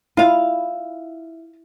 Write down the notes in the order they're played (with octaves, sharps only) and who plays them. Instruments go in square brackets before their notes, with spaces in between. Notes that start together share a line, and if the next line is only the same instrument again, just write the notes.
[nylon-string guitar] E4 [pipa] F4 F5